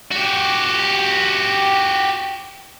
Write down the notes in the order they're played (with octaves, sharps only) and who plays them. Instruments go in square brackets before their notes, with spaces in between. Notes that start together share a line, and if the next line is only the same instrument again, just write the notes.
[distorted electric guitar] F#4 G4